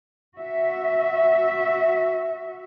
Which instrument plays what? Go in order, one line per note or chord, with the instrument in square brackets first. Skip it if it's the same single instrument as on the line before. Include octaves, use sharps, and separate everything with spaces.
[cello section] F#4 E5